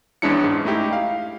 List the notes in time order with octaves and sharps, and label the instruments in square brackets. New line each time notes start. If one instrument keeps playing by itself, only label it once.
[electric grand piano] E2 G#3 C#4 D4 E4 C#7
G#2
A3 D#4 E4 G4
F5